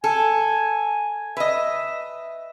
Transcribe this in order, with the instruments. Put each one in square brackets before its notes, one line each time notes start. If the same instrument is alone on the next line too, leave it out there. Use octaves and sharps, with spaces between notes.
[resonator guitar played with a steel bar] A4 [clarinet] G#5
[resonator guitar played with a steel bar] B4 D#5 [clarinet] E5